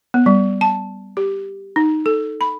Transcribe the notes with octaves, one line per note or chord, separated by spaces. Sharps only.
B3
G3
A5
G4
D#4
A4
B5